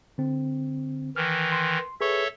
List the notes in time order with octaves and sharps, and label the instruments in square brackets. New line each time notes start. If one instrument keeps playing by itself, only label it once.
[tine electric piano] D3 C4
[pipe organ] D#3 E3 [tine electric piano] F6
[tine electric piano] C6
[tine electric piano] G#4 B4 C#6 [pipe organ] A4 C#5 E5